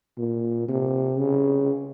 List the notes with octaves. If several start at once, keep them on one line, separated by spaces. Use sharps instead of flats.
A#2
C3
C#3